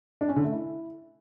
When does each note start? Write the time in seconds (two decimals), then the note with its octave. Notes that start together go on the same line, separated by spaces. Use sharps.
0.21 D4
0.29 C#4
0.36 D3
0.44 A3
0.52 E4